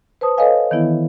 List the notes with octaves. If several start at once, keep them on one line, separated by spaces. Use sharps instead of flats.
B4 C5 A5 D#6
A4 B4 C#5 D#5 F5 G#5
D#3 E3 B3 E4